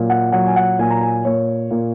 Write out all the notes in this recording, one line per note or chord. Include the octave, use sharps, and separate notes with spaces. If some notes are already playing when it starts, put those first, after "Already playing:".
Already playing: A#2 F#3
F#5
F#3 F#5
G#5
F#5
A#2 G#5
A#5
G#5
A#2 C#5
A#2